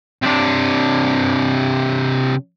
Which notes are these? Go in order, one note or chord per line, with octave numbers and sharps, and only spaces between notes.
C3 D4